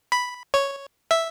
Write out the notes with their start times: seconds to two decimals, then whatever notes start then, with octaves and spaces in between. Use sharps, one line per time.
0.12 B5
0.54 C#5
1.11 E5